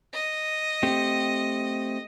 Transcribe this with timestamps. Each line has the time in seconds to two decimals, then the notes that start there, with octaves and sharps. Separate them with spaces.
0.13 D#5
0.83 A3 C4 G4